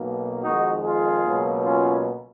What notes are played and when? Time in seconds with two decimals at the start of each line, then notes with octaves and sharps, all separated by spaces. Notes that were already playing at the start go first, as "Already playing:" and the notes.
Already playing: B1 B2 A#3
0.44 F2 D#3 G#3 D#4 F#4
0.84 F4 G#4
1.24 C#2 B2 F#3 A#3
1.65 C#4 F4